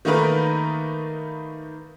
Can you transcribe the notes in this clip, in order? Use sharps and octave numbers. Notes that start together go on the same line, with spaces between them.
D#3 A3 A#3 D#4 A#4 B4